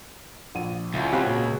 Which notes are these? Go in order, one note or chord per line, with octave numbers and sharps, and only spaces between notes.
A#1 D#7
C#2 E4 F4 F#5
C4 F4 G4 F#5 B5 F#6
A#2 F#4 G#4